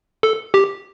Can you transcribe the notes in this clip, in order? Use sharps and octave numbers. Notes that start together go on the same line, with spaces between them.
A4
G4